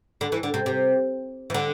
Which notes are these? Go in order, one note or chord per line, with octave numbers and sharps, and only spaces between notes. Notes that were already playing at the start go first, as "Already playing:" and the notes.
D3
E3
D3
C3
C3
E3
D3